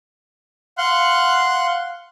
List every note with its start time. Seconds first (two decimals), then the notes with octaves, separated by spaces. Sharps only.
0.78 F5 F#5 C6 F#6